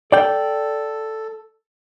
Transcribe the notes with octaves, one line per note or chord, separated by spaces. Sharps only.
A4 D5 G5